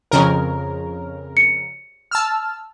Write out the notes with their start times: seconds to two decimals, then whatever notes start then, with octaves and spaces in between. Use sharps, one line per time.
0.11 F2 C#3 A#4
1.37 C#7
2.11 A5 E6 F6